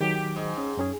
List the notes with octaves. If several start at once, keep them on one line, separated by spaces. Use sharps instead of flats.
D#3 F#3 G4
G#2
C#4
F#2 C#4 G#4